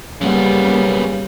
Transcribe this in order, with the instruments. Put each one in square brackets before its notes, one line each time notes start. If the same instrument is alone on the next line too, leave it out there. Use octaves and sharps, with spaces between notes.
[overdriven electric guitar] F#2 B3 [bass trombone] C#3 [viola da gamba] G3 [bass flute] A#3